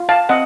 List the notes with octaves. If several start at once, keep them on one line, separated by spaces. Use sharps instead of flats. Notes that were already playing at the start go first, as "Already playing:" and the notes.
Already playing: F4
F5 A5
C4 D#5 F#5